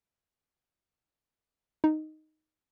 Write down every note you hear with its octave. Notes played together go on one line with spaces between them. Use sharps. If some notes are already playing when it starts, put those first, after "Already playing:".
D#4